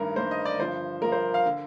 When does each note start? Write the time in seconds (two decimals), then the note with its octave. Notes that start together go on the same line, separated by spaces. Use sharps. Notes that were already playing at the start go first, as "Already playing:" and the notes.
Already playing: A1 G2 D#3 A#4
0.16 A1 G2 D#3 C5
0.31 D#5
0.45 D5
0.59 G1 G2 F3 C5
1.02 G1 G2 F3 A#4
1.12 C5
1.34 F5
1.46 D3